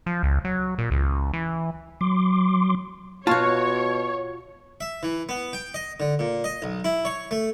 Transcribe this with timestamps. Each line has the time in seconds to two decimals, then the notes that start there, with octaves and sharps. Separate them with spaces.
0.06 F3
0.23 C#2
0.45 F#3
0.78 A#2
0.91 C#2
1.33 E3
2.01 F#3 C6 D6
3.27 B2 F4 F#4 C#5 F5 A5
4.81 E5
5.03 E3
5.29 B3
5.53 G5
5.74 D#5
6.00 D3
6.19 A#2
6.44 D#5
6.62 B1
6.84 E4
7.05 C#5
7.31 A3